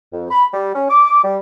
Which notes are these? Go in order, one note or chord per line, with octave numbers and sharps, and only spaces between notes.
F2
B5
G3
C#4
D6
G3